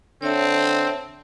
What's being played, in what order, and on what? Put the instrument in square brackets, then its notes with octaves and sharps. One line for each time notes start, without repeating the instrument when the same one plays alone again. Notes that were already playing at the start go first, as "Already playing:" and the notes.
[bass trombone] D3 [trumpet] C4 [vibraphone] C#5 E5 A5